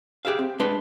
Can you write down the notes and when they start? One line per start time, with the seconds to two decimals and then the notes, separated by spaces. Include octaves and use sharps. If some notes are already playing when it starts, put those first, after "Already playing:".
0.25 G4 G#4 E5 F5
0.39 C4
0.59 G#3 D4 B4 C6